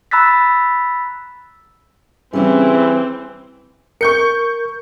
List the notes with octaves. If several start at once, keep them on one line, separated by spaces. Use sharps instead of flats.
A#5 B5 E6 F#6 A6 B6
C#3 E3 G3 C4 C#4 E4
A#4 C#6 G6 C#7